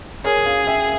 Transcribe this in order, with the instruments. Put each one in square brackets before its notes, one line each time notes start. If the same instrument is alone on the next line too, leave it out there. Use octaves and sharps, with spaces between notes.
[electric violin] G#4 [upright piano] A#4 C#5
[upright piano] F5 G#5
E5 G5